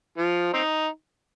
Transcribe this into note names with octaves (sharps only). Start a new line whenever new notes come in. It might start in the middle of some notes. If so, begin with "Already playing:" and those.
F3
C4 D#4